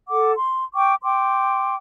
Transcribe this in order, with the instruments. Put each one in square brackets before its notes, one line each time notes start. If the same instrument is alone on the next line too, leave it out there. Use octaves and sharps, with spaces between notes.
[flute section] A4 F#5 D6
C6
G5 C#6 D6
G5 C6 D6